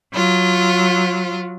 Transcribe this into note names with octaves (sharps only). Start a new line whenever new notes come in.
F#3 F4